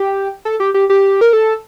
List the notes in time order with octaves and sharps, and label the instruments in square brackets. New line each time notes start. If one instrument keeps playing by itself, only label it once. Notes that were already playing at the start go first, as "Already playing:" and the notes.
Already playing: [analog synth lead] G4
A4
G4
G4
G4
A#4
A4